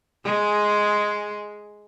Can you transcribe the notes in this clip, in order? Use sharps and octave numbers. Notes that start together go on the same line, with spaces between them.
G#3 G#4